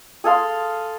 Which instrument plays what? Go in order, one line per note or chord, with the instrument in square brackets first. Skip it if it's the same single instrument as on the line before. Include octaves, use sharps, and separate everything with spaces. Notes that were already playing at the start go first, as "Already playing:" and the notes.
[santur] G#4 A4 F5 C6